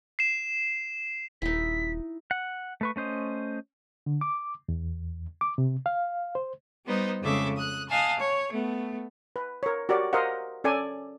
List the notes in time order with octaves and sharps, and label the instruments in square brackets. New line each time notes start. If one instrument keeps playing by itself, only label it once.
[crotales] C7 E7
[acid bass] D#1 [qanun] D#4 E4 [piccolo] B6
[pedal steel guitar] F#5
A3 B4 C#6
A3 C#4 C5 D#5
[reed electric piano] D3
D6
E2
D6
C3
F5
C5
[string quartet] G3 B3 D#4 C5
F2 C#3 G#3 A4 E5 D6
D#6 F#6
D#5 F5 F#5 G#5 A5
C#5
A3 B3
[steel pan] B4
A#4 C#5
F#4 G4 A#4 C#5 D5
A#4 C5 D#5 F5 F#5
C#4 A4 D5 G#5